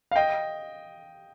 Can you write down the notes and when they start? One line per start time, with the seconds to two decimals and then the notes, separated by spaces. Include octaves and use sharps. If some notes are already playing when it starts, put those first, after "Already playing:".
0.11 F5
0.16 D#5 G5